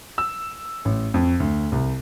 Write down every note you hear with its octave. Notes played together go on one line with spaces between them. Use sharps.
E6
A1
F2
D2
C2